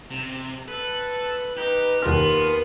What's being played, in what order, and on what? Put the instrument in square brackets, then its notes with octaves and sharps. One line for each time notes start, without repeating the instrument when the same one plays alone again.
[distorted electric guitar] C3
[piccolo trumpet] A4 [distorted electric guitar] B4
[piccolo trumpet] D#4 [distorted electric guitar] G4 [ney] B4
[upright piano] D#2 F6 [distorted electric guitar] B3 [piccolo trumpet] F4 [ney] A#4